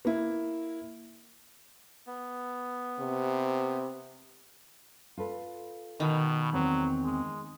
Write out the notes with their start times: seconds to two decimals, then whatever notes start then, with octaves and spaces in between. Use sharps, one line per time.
0.05 A#3 E4
2.07 B3
2.99 C3
5.18 F4 A4 B4
6.00 B2 D#3
6.53 E2 F#3 C4
7.04 G#3